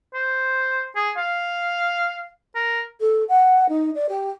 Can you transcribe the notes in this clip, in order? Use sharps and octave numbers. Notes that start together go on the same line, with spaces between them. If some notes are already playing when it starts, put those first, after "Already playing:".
C5
G#4
F5
A#4
A4
F#5
D#4
D5
G4